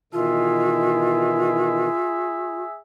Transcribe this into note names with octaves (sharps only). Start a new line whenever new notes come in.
B2 D#3 E3 F4 G#4 E5